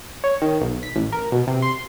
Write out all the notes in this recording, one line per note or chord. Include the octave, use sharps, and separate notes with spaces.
C#5
D#3
B1
B6
A1
A#4
B2
C3
C6